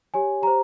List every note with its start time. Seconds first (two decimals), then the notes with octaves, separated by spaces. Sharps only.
0.14 G4 C#5 G#5
0.42 G4 A#5
0.47 C5